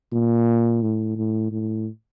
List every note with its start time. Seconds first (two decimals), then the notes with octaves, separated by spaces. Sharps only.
0.13 A#2
0.82 A2
1.17 A2
1.52 A2